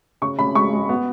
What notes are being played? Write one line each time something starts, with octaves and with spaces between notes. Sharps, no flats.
C#3 C#6
C#3 B5
G#3 C#6
G#3
B3